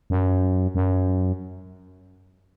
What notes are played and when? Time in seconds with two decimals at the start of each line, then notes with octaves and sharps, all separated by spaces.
0.10 F#2
0.75 F#2